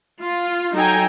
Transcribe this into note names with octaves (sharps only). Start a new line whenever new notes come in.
F4
F#3 D#4 A4 G5 G#5 A#5